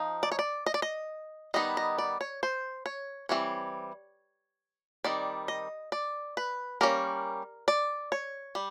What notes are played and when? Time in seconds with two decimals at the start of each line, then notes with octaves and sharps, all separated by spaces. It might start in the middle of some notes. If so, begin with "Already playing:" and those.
Already playing: F3 D#4
0.23 D5
0.32 C#5
0.39 D5
0.66 D#5
0.74 D5
0.82 D#5
1.54 D#3 G3 B3 D#4 D#5
1.77 D#5
1.98 D5
2.21 C#5
2.43 C5
2.86 C#5
3.29 E3 G3 C4 C#5
5.04 D#3 G3 C4 D5
5.48 D#5
5.92 D5
6.37 B4
6.81 G3 A#3 C#4 A#4
7.68 D5
8.12 C#5
8.55 G3